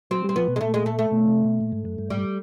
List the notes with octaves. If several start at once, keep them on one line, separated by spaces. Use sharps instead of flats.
F#3 C4
G3 C4
F3 B3
B2
G#3
A#2 A3
G#3
A3
A3
B2
C3
B2
A#2
G#2
F#2
G2
G#2 G3
G2